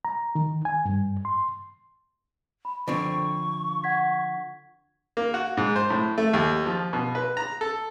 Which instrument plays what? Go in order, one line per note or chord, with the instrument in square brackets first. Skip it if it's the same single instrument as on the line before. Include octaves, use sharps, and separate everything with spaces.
[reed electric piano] A#5
D#3
G#5
G2
C6
[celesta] B5
[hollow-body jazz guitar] D3 F3 C4 [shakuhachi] C#6
[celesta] F#5 G#6 B6
[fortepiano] A#3
F#4
G#2
C5
A2
A3
D#2
F3
B2
B4
A#5
A4